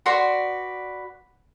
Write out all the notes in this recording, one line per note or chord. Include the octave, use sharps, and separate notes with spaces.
F#4 B4 D5 C6